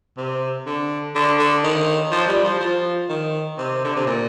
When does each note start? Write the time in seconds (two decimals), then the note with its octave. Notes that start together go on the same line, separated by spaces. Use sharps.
0.18 C3
0.66 D3
1.15 D3
1.39 D3
1.64 D#3
2.12 F3
2.28 G3
2.44 F3
2.60 F3
3.09 D#3
3.58 C3
3.84 D3
3.96 C3
4.06 A#2